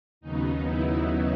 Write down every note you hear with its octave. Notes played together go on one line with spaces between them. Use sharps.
D#2 C#3 F#3 B3 D#4
E4